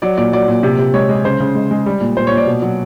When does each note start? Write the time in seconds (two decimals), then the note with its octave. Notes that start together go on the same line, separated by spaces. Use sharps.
0.02 F#3 D5
0.17 A#2 D5
0.33 F#3 D5
0.48 A#2
0.63 C3
0.78 C3
0.94 G#3 C#5
1.09 G#3
1.25 C#3 C5
1.40 C#3
1.55 G#3
1.71 G#3
1.86 G3
2.01 A#2
2.17 A#2 C5
2.27 C#5
2.32 A#2
2.37 D5
2.47 B2
2.62 F#3